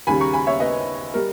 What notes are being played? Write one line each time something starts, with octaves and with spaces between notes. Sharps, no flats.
D#2 C#3 G3 G#5 B5
A#5 C#6
G#5 B5
C#5 E5
B4 D#5
G3 A#4